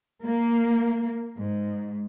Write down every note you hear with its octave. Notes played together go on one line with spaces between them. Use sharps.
A#3
G#2